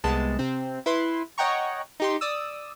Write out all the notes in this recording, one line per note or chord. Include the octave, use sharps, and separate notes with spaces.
C2 G#3 B3 A5
C3 C4
E4 B4 C6
C#5 D#5 F#5 G5 A#5 C#6
D#4 G4 C6
D5 D#6 E6